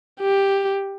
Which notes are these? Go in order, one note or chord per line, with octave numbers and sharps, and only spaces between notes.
G4